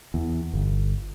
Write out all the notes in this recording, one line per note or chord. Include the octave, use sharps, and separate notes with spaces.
E2
G1